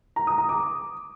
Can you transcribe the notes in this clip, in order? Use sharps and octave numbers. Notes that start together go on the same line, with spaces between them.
A#5
D#6
A#5
D6